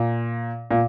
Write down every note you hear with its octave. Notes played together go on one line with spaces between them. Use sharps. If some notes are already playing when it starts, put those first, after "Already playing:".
Already playing: A#2
A#2